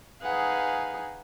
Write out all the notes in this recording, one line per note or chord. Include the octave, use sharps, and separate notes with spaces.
D#4 G#4 B4 F5 F#5 G#5